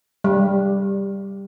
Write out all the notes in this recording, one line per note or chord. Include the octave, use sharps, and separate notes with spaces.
G3